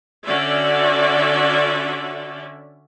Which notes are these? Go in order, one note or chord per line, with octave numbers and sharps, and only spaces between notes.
D3 C#4 F#4 D5 E5